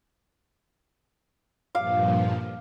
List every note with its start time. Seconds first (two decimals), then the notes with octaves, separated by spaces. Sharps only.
1.75 G2 A#2 F3 F5 D6